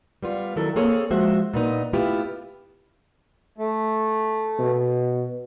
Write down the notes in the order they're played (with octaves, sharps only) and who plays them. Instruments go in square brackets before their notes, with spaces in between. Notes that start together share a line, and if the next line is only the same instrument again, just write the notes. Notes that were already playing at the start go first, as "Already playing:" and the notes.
[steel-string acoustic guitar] G3 B3 F4
D#3 F#3 E4 A4
A#3 C4 G#4 A4 C#5
F3 G#3 F#4 C5 E5
A#2 B3 D#4
A3 B3 E4 F4 G4
[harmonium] A3
[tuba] B2